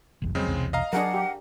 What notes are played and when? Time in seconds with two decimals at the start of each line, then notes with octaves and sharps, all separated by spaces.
0.22 F#1 B1 E2
0.35 F2 C#3 F#3 G#3 C4
0.47 B1 E2 C3
0.73 D#5 F5 A#5
0.93 F#3 D4 G#4 A#4 F#5
1.14 G4